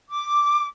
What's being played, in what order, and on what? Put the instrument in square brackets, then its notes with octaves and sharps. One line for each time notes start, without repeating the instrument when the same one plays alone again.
[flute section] D6